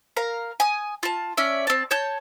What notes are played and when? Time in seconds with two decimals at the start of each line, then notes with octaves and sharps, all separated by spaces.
0.17 A#4 F5 A#5
0.60 G#5 D#6
1.03 F4 A5
1.37 C#4 D5 E5
1.67 C4 A5
1.91 C#5 A5 G6